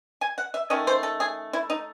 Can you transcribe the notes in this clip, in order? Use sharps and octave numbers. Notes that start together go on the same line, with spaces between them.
G#5
F#5
E5
D#3 A3 C#4 D#5
C5
A4
G#4
E4
D#4